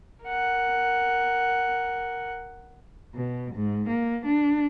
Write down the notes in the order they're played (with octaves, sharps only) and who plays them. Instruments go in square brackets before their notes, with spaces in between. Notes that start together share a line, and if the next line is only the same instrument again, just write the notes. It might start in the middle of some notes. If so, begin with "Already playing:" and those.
[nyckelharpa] A#4 F#5
[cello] B2
G#2
A#3
D4